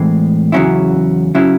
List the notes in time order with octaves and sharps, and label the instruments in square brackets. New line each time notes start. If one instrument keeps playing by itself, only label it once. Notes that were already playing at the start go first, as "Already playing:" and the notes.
Already playing: [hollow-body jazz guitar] A2 E3 G#3 C4
E2 C#3 F#3 C#4 E4
C#3 F#3 C#4 E4